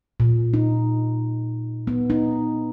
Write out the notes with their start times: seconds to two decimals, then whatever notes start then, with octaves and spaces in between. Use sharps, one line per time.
0.20 A#2
0.53 D#4
1.87 B3
2.10 D#4